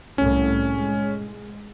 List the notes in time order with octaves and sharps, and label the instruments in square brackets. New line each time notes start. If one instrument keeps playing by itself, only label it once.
[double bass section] C2 A2 [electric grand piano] C#4
[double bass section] G#3